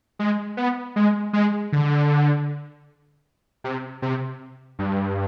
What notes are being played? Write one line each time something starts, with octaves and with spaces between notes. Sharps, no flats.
G#3
B3
G#3
G#3
D3
C3
C3
G2